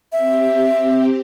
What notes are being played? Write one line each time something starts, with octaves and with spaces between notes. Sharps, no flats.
C4 G4 E5